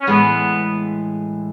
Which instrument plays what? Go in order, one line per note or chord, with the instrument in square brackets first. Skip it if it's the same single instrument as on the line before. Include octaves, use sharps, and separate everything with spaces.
[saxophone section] C#4
[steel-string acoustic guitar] A2 E3 G#3 [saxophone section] B3